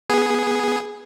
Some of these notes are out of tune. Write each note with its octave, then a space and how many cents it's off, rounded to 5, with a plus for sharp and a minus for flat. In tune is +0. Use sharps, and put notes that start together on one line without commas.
B3 -10 G#4 +0